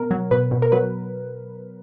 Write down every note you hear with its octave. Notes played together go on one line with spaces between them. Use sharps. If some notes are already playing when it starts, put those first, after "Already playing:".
Already playing: B2 A#4
F#3
B2 B4
B2
A#4
F#3 B4